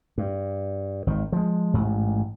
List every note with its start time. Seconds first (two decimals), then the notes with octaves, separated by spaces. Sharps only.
0.18 G2
1.07 G#1 D#3
1.32 F3 G#3
1.74 A1 G#2